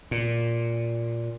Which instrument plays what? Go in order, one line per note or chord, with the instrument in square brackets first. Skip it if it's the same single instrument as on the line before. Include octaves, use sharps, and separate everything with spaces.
[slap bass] A#2